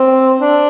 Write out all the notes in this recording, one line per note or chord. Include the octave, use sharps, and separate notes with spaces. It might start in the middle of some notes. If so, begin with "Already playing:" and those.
Already playing: C4
D4